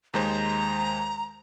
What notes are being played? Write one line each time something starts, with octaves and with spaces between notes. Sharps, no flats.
D#2 G#3 C5 A#5